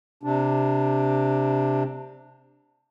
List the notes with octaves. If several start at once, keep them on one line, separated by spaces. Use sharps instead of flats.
C3 D4